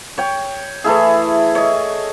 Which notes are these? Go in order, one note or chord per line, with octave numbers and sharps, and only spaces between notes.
C#5 G5
E3 A3 E4 G#4
C#5 D#5